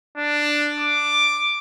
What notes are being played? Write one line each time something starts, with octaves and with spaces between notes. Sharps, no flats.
D4
D6